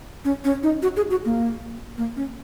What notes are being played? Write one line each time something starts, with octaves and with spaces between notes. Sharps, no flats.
C#4
C#4
D#4
F#4
G#4
F#4
A#3
A#3
C#4